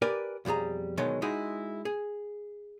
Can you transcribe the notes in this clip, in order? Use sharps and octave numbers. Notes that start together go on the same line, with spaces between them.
G4 A#4 B4 D5 G#5
B1 F2 G3 G#4 A#5
D2 B2 D#3 F#3 G#3
G#3 D#4 E4 F#4 G#4
G#4